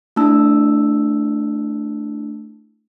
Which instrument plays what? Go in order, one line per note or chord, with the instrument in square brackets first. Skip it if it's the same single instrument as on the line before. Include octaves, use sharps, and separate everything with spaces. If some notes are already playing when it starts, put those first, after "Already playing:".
[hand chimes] A3 D4 E4 A5 E6